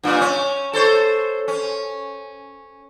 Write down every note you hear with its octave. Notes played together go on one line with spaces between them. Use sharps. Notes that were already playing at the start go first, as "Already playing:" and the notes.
G2 A#2
C#4
A4 C5 C#5
C#4